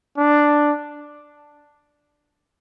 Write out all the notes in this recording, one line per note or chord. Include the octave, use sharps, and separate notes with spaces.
D4